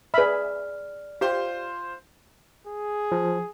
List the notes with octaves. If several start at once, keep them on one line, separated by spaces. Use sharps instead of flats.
G#4 B4 D5 E5 B5 F6
F4 G4 C5 C6
G#4
F3